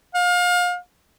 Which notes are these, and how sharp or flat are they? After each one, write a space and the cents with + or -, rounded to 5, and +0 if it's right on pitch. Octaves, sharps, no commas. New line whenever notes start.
F5 +30